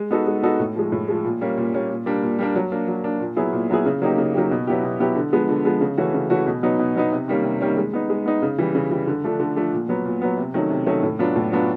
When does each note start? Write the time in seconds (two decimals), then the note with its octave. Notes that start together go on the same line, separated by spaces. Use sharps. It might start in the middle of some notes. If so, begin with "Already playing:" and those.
Already playing: G#3
0.11 B3 D#4 F#4 A4
0.27 G#3
0.43 B3 D#4 F#4 A4
0.60 A2
0.76 F3 G#3
0.92 A2
1.08 F3 G#3
1.24 A#2
1.41 G3 A#3 C#4
1.57 A#2
1.74 G3 A#3 C#4
1.90 A#2
2.06 G3 A#3 D4
2.22 A#2
2.39 G3 A#3 D4
2.55 F#3
2.72 A#3 D4
2.88 F#3
3.04 A#3 D4
3.20 A#2
3.36 F#3 B3 E4 G#4
3.53 A#2
3.70 F#3 B3 E4 G#4
3.86 C#3
4.02 F#3 A#3 D#4 G4
4.18 C#3
4.35 F#3 A#3 D#4 G4
4.51 B2
4.67 F#3 B3 E4 G4
4.83 B2
5.00 F#3 B3 E4 G4
5.16 D3
5.32 F3 G#3 B3
5.49 D3
5.65 F3 G#3 B3
5.81 C#3
5.98 E3 A3 C#4 F#4
6.14 C#3
6.30 E3 A3 C#4 F#4
6.46 B2
6.63 F#3 B3 D#4
6.79 B2
6.96 F#3 B3 D#4
7.12 C3
7.28 D#3 G3 A#3 C#4
7.44 C3
7.61 D#3 G3 A#3 C#4
7.77 G#3
7.93 B3 D#4
8.10 G#3
8.26 B3 D#4
8.42 C#3
8.58 E3 G3
8.75 C#3
8.91 E3 G3
9.07 D3
9.24 F3 A3 D4
9.40 D3
9.56 F3 A3 D4
9.73 A#2
9.89 F#3 B3
10.05 A#2
10.22 F#3 B3
10.37 C3
10.54 D#3 F#3 A3 C#4
10.70 C3
10.86 D#3 F#3 A3 C#4
11.03 A2
11.19 F#3 B3 D4 F4
11.36 A2
11.52 F#3 B3 D4 F4